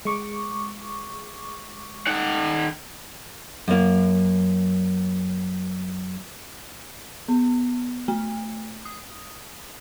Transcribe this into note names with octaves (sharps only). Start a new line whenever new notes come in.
G#3 C#6 D6
D#3 F#5
F#2 A#3
B3
A3
D#6